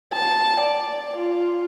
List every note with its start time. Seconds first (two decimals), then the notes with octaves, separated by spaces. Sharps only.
0.13 A5
0.61 D5
1.17 F4